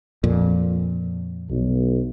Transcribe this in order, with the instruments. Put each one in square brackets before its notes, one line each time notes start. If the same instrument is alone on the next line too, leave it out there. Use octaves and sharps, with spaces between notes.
[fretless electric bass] F2 A#2
[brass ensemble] B1